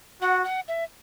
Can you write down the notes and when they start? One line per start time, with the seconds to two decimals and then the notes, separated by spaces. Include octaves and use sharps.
0.22 F#4 F#5
0.45 F#5
0.68 E5